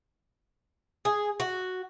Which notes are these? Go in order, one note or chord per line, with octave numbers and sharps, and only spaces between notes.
G#4
F#4